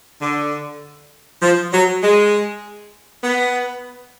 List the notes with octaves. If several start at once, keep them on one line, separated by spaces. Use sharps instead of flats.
D3
F3
F#3
G#3
B3